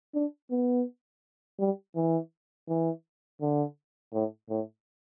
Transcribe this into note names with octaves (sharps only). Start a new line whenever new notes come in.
D4
B3
G3
E3
E3
D3
A2
A2